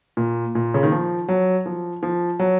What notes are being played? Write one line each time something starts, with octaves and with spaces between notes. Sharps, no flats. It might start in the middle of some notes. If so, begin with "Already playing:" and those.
A#2
A#2
C#3
D#3
F3
F#3
F3
F3
F#3